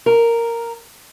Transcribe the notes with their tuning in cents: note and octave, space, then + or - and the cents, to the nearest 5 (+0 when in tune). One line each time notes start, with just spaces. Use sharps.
A#4 -5